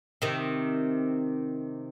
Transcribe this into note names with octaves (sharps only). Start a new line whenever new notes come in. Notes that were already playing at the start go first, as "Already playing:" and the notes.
C3 D#3